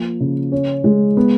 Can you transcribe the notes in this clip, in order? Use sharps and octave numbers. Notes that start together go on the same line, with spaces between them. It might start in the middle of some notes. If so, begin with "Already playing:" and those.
Already playing: F3 A#3
C#3
C#4
G#3
B3